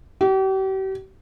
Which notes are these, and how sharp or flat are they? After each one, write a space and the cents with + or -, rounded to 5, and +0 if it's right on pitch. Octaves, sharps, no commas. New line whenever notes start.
G4 -40